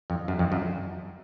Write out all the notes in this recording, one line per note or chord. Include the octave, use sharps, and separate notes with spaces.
F2
F#2
F2
F#2